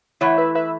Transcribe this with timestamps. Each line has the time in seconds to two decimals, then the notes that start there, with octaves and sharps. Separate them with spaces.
0.21 E3 A3 E4 C#5 F#5
0.38 B4 E5
0.55 B4 E5